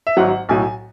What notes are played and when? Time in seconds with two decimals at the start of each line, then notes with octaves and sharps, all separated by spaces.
0.07 E5
0.17 G#1 G#2 F#3 F#5
0.49 B1 A2 F#3 G#5